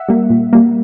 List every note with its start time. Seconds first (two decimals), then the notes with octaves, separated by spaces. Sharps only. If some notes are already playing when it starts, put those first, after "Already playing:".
Already playing: E5 F#5
0.08 G3 A#3
0.30 A#2
0.53 G3 A#3